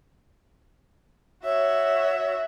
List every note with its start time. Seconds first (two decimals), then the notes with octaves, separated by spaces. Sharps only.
1.45 F#4 C#5 E5